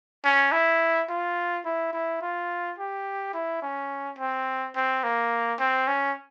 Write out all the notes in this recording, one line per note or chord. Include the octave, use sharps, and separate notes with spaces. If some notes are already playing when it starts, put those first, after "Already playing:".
C#4
E4
F4
E4
E4
F4
G4
E4
C#4
C4
C4
A#3
C4
C#4